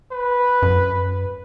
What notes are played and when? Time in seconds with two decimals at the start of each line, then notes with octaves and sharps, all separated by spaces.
0.12 B4
0.62 F#2